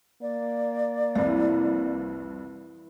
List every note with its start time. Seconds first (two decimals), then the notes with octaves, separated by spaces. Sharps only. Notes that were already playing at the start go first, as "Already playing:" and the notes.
0.22 A#3 D5
1.15 C2 F2 E3